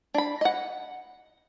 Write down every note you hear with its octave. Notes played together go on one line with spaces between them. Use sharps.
D4 B5
D#5 F#5